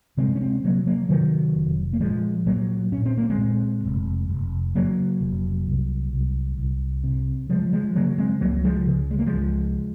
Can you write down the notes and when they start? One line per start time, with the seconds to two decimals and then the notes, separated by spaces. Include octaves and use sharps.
0.17 C3 G#3 C4
0.35 C#4
0.41 G#3 C4
0.64 C3 F#3 A#3
0.86 F#3 A#3
1.09 C3 D#3 F#3
1.55 F1
1.93 A#3
2.00 A#2 F3 G#3
2.46 A#2 F#3 A#3
2.92 A#2 C#4
3.05 C4
3.17 A#3
3.30 G#3 C4
3.38 A#2
3.84 F1
4.29 F1
4.75 C#3 F#3 A#3
5.21 F1
5.67 C2
6.13 C2
6.58 C2
7.04 C3
7.49 C#3 F3 G#3
7.73 F3 G#3
7.96 C#3 F#3 A#3
8.18 G#3 C4
8.41 C#2 F#3 A#3
8.64 F3 G#3
8.87 C#3
9.11 G#3
9.19 A#3
9.26 F3 G#3
9.33 C#2